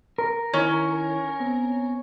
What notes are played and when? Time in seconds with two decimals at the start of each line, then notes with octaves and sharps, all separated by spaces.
0.18 A#4
0.53 D#3 C#4 D#4 E4 C#5
1.40 B3 C4